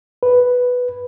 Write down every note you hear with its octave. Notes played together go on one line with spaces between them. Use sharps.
B4